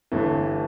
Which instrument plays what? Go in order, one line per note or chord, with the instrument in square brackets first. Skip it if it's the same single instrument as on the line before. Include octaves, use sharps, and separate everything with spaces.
[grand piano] G1 G2 E3 A3